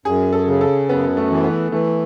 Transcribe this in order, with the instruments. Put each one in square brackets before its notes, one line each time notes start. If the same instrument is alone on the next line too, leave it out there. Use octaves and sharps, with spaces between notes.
[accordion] F#2 [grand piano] G#4
[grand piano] A4
[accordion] C#3
[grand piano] A4
[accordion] F#2 [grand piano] B3
[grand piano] A3
[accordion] E3
[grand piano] B3
[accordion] E3 [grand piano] A3